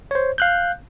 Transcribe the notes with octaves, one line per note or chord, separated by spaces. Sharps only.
C5 C#5
F5 F#6 G6